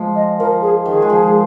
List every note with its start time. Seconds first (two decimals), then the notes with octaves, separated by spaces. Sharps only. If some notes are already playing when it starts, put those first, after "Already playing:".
Already playing: F3 G#3
0.15 D#5
0.40 F3 A#4
0.62 G#4
0.86 D#3 G#4
1.02 G#3
1.10 F3